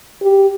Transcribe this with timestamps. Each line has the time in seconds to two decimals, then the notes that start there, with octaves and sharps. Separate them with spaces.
0.22 G4